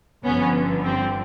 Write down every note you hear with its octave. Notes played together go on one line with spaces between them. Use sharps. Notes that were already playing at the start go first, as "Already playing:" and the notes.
G1 G2 D3 F3 B3 C#4
C4